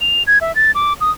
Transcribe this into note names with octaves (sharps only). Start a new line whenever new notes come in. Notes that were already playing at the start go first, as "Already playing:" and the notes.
F7
G#6
E5
A6
D6
D#6